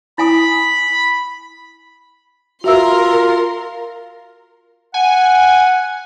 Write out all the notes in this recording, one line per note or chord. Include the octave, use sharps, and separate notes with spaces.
E4 G#5 B5 D#6
F4 F#4 A#4 E5 C6 E6
F#5 G#5